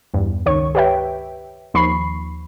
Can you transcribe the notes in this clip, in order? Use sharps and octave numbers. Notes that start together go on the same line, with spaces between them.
E2 G2
C#2 D#3 C#5 C#6
G4 B4 C#5 E5 G5
D#2 F3 B5 C#6 C7